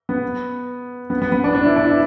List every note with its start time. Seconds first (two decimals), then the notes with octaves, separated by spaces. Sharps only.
0.09 B3
1.10 B3
1.22 B3
1.32 B3
1.44 D4
1.55 D4
1.65 E4
1.76 D4
1.87 E4